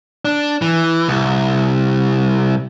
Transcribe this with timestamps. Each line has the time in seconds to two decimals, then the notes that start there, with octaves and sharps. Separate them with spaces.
0.25 D4
0.62 E3
1.08 C2